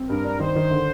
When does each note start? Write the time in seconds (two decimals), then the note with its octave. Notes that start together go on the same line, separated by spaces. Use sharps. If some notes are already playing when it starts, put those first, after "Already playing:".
Already playing: C4
0.09 G2 A#4
0.24 D4
0.40 D#3 C5
0.56 D#3
0.71 D3